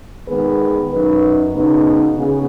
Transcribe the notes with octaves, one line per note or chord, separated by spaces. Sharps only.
D#3 G#3 B3 G#4 B4
F#2 F#3 D#4 B4
C#3 B3 D#4 F#4 B4
C#3 B3 G#4